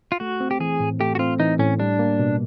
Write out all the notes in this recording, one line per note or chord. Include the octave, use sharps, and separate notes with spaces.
F4
A3 F#4
C4
G4
E3 G#4
A2
A3 G4
F#4
C4 F4
E3 D#4
A2 C#4
G3 D4
A#3
B2